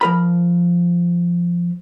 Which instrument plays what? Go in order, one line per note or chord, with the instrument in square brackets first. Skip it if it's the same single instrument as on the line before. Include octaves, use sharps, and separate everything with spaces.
[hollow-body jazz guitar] F3 A#4 B5